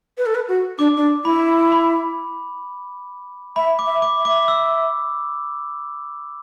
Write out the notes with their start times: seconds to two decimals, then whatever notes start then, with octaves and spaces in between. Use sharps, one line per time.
0.18 B4
0.26 A4
0.35 B4
0.48 F#4
0.79 D4 D6
0.97 D4
1.25 E4 B5
1.72 B5
3.56 E5 B5
3.79 D6
3.86 E5
4.02 D6
4.17 E5
4.25 D6
4.48 E6